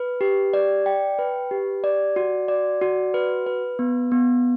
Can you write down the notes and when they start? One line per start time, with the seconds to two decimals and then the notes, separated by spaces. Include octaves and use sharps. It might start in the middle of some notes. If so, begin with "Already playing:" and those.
Already playing: B4
0.21 G4
0.53 D5
0.86 G5
1.19 B4
1.51 G4
1.84 D5
2.16 F#4
2.48 D5
2.81 F#4
3.14 B4
3.46 B4
3.79 B3
4.12 B3